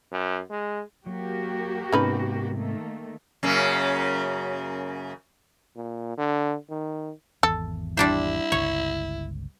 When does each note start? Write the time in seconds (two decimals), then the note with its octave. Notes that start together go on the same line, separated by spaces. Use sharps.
0.12 F#2
0.50 G#3
1.06 F#3 A#3 F#4 G4
1.92 G#2 C3 B3 C#4 D#4 B4
2.55 D#3 A3 A#3
3.43 F#2 C#3 A#3
5.76 A#2
6.18 D3
6.70 D#3
7.43 G#1 E2 A4
7.97 G3 D4 E4 C5
8.52 G1 C#2 C#5